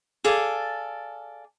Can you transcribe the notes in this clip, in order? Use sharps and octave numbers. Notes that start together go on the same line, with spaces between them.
G#4 A4 D5 F5